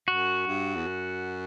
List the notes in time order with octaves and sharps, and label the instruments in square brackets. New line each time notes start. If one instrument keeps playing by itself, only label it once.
[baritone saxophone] F#2 [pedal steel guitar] F#4
[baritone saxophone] G2
E2
F#2